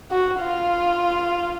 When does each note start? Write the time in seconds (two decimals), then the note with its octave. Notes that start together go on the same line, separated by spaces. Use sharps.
0.11 F#4
0.40 F4